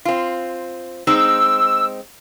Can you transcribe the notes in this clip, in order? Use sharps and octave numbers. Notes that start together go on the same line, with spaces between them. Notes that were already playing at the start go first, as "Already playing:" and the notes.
C4 F4
G#3 C4 D#4 E6